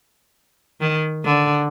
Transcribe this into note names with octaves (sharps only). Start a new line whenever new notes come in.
D#3
D3